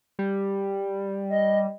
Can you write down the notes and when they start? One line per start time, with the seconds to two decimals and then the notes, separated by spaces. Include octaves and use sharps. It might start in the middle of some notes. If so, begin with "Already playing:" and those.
0.19 G3
1.30 D#5